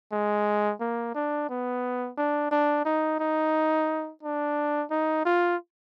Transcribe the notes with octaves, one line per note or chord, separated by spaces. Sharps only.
G#3
A#3
D4
B3
D4
D4
D#4
D#4
D4
D#4
F4